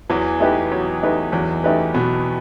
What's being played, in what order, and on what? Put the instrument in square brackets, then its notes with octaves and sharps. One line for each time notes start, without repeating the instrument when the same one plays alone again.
[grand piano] E2 E3 [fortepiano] F#3
[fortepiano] A3 D#4 G4 B4
F#3
A3 D#4 G4 B4
[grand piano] E2 E3 [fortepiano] F#3
[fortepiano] A3 D#4 G4 B4
[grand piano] B2 B3 [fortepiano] F#3